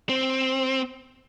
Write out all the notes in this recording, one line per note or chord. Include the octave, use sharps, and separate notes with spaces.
C4